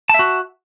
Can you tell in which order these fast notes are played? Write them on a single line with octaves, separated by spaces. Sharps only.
A5 E5 F#4